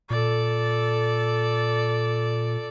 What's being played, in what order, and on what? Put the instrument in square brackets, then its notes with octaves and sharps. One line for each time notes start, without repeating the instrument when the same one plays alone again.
[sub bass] A#2 [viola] A4 D5